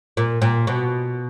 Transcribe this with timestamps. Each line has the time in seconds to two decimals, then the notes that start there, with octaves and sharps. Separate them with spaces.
0.17 A#2
0.42 A#2
0.67 B2